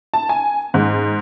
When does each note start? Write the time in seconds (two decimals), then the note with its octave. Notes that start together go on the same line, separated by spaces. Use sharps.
0.14 A5
0.29 G#5
0.74 G#2